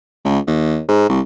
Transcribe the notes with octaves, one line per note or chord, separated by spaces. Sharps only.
C#2
D#2
G#2
C2